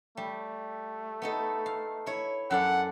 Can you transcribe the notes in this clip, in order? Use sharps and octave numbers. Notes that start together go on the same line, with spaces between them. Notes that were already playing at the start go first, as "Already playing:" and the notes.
G3 A3
B3 D#4 A4
F5
E4 C#5
F#2 A4 D5 F#5